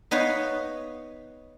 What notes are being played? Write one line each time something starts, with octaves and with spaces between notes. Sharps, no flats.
B3 D#4 B4 C#5 F5